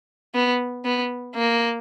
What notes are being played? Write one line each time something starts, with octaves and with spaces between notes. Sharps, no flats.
B3
B3
A#3